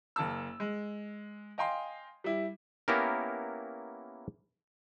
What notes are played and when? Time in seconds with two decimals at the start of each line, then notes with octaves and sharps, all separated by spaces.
0.16 F#1 A#3 A5 E6
0.60 G#3
1.58 D#5 F5 G5 G#5 C6
2.24 G3 E4
2.88 A#3 B3 C#4 E4 G4 A#4